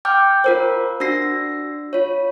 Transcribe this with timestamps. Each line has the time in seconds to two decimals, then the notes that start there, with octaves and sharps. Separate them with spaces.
0.05 G5 D6 F6 G6
0.44 F4 A#4 C5
1.00 D4 F#4 E6 A#6 C7
1.93 F4 C#5